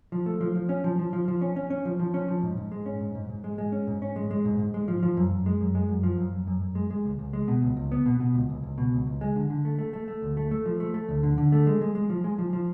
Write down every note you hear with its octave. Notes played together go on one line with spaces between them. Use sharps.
F3
A3
F3
F3
C#4
F3
F3
F3
F3
C#4
C#4
C#4
F3
F3
C#4
F3
G#2
G#2
G#3
C#4
G#2
G#2
G#2
G#3
G#3
C#4
G#2
C#4
G#3
G#3
G#2
G#2
G#3
F3
F3
F#2
F#2
G#3
F#2
G#3
F#2
F3
F#2
F#2
F#2
F#2
G#3
G#3
C#2
C#2
G#3
B2
C#2
C#2
B3
B2
B2
C#2
C#2
C#2
B2
C#2
C#2
G#3
D3
D3
A3
A3
A3
A3
D2
A3
A3
F3
A3
A3
D2
D3
D3
A3
G#3
G#3
G#3
F3
G#3
F3
F3